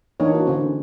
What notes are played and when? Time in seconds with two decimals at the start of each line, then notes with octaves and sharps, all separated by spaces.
0.20 E3 A#3 D4 D#4 C#5
0.35 F#4
0.46 D3 C#4 C5